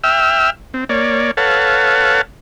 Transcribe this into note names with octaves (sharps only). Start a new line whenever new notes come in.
E5 G5 E6 F6
C4
A#3 C#5 D5
A4 B4 C#5 F5 F#5 A5